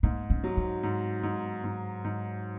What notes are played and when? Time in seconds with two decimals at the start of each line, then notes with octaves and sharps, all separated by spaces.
0.03 G#2 A#3
0.30 C#4
0.44 F#3
0.57 C4
0.83 G#2
1.23 G#2
1.64 G#2
2.04 G#2